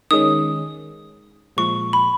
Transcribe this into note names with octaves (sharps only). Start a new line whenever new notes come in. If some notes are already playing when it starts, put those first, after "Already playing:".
D#3 G#3 C#4 D#6
A#2 F3 G#3 C#6
B5